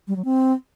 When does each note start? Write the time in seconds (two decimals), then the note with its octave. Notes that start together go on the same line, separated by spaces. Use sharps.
0.08 G3
0.16 F#3
0.25 C4